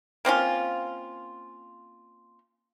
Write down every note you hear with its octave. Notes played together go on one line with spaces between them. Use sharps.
A#3 C4 C#4 F4